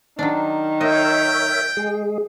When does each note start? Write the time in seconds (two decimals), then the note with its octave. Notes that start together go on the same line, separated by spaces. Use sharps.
0.19 D#3 F#3 D4
0.81 A#4 C#5 D#5 E5 G5
1.77 G#3 G#4